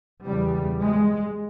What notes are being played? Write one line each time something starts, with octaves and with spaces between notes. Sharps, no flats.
E2 C#3 G3
G#3